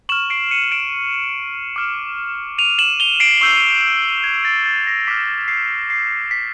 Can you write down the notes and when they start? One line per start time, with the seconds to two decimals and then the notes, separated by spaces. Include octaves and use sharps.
0.09 C#6 F6 E7 F#7
0.30 C7 D7
0.51 C#7 D#7
0.71 D7 E7
1.76 D6 F6
2.58 D#7 F7
2.78 E7 F#7
3.00 F7 G7
3.20 C7 D7
3.41 C#6 E6 G6 C7
4.24 G#6
4.45 A6
4.66 A6
4.87 A#6
5.07 D6 F6 B6
5.48 C7
5.90 C7
6.31 B6